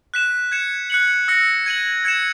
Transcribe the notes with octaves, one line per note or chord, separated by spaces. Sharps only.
F#6 B6 E7
G#6 C#7 E7
F#6 C#7 F#7
E6 A#6 C#7
G#6 D#7 F#7
G#6 C#7 E7